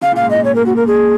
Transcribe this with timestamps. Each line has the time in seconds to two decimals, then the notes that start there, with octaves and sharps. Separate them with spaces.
0.02 C#3 F5
0.12 A#2 F5
0.23 G#2
0.31 A#2 D#5
0.45 C#5
0.55 A#4
0.66 F#4
0.76 A#4
0.87 G#4